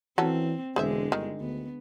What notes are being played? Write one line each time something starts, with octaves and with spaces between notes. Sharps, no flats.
E3 F#3 C4 C#4 A4
E1 D3 G#3 G#4 C5 E5
G1 D#3
D2 B3